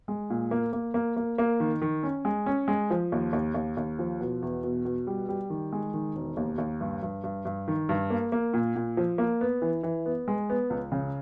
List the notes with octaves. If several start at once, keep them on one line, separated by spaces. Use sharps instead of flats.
G#3
A#2
A#3
A#3
A#3
A#3
A#3
D#3
D#3
C#4
G#3
C#4
G#3
F3
D#2
D#2
D#2
D#2
F3
B2
E2
B2
B2
G3
G3
D#3
G#3
D#3
E1
D#2
D#2
G2
G2
G2
G2
D#3
G2
A#3
A#3
A#2
A#2
F3
A#3
B3
E3
E3
B3
G#3
B3
C#2
C#3